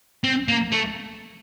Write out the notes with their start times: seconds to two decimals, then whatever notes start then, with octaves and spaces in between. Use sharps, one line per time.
0.24 C4
0.48 A#3
0.72 A3